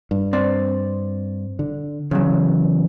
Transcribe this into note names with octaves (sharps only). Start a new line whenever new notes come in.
G2
C4 D5
D3
E2 C#3 F#3